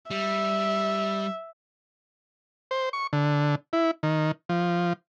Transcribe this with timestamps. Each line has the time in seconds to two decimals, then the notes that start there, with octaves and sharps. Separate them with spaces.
0.11 G3 E5
2.71 C5
2.93 C#6
3.13 D3
3.73 E4
4.03 D#3
4.49 F3